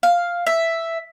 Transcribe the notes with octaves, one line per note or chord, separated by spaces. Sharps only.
F5
E5